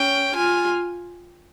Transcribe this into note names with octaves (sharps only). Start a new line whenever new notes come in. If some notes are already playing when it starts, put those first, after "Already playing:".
Already playing: C#4 G5
F4 G#5